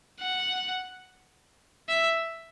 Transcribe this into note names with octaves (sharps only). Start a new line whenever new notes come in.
F#5
E5